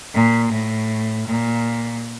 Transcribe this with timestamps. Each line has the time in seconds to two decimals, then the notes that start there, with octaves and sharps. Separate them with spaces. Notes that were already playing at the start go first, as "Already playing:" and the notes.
0.14 A#2
0.52 A2
1.27 A#2